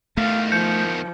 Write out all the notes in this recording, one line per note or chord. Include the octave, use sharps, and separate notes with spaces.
E2 D#3 A3 F5
F3 G6 C#7